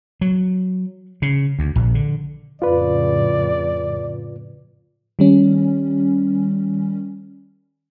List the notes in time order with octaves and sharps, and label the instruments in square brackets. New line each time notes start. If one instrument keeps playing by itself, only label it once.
[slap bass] F#3
C#3
D2
A#1
D3
[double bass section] F2 A2 C#3 [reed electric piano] F4 B4 [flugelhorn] D5
[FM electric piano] D#3 G3 C#4